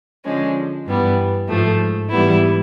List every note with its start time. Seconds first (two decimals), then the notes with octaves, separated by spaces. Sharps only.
0.25 D3 F3 G#3 C#4
0.86 G2 E3 G3 B3
1.49 G#2 F3 A3
2.10 G#2 E3 G3 B3 E4